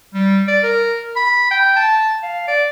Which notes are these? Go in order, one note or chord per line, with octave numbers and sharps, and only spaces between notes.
G3
D5
A#4
B5
G5
A5
F5
D5